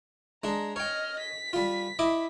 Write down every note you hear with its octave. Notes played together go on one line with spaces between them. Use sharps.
G#3 D4 A#5
C#5 D#5 G5 F6
B6
G3 F4
E4 D#5 D6